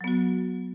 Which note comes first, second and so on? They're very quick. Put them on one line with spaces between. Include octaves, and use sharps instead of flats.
F#3 B3 F#4